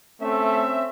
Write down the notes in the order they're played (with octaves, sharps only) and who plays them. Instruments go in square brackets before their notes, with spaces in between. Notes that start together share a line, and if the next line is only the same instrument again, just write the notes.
[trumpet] A3 [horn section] C4 C#4 E5